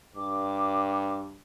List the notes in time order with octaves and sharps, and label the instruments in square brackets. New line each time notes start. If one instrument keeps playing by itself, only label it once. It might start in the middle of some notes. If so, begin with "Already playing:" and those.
[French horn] G2 [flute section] D6